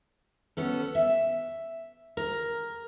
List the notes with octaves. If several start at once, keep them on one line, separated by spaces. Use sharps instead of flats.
B3 C#4 A4
E5
A#4